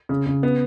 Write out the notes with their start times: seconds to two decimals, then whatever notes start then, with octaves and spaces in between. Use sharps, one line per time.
0.09 C#3
0.26 C#3
0.43 B3